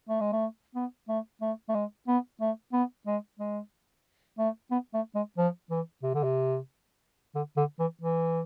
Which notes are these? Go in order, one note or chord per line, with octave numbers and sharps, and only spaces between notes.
A3
G#3
A3
B3
A3
A3
A3
G#3
B3
A3
B3
G#3
G#3
A3
B3
A3
G#3
F3
E3
C3
D3
C3
D3
D3
E3
E3